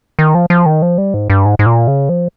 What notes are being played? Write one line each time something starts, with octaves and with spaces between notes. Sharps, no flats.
D#3
F3
F3
D#3
F3
G3
G#2
G2
G#2
G#2
A#2
C#3
F3